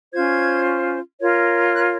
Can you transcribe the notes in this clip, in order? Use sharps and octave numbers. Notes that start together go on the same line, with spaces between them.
C#4 F4 C5 G#6
F4 A#4 C#5
F#6